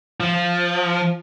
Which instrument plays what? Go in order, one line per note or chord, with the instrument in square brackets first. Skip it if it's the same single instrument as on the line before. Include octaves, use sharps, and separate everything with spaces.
[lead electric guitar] F3